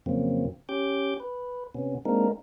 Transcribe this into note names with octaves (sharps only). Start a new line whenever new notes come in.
F2 C#3 F#3 A#3 C4
C#4 G4 D6 G6
B4
C3 B3 C#4
G#3 A#3 C4 D4 D#4 A#4